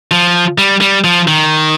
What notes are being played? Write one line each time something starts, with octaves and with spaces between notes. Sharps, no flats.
F3
G3
G3
F3
D#3